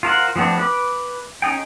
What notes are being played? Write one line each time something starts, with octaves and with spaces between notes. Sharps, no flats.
F4 A#4 C5 F#5
F3 A3 B3 C4 D4
B4 B5 D6
C#4 D#4 G#4 G5